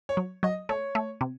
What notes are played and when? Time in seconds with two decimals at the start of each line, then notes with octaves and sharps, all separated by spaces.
0.09 C#5
0.17 F#3
0.43 F#3 D#5
0.69 A3 C#5
0.95 A3
1.21 C3